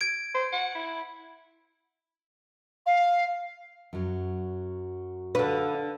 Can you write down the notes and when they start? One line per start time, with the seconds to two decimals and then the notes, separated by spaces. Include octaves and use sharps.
0.01 G#6 D7
0.34 C5
0.52 F#5
0.75 E4
2.86 F5
3.93 F#2 F#3
5.35 D3 D4 B4 F5